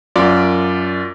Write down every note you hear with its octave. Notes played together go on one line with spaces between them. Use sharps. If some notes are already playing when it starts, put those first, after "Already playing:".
F#2 F4 D5 D6